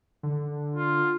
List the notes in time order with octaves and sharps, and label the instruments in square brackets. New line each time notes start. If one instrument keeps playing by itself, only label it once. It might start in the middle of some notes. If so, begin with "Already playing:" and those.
[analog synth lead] D3
[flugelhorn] F4